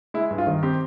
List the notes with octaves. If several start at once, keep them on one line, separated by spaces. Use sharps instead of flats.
G#3 E4
G2
F4
D#3
C4 G4